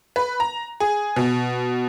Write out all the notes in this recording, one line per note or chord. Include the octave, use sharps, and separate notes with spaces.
B4
A#5
G#4
B2